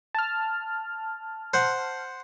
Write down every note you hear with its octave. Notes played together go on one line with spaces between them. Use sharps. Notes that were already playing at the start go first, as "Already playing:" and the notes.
A5 F6
C5 F#5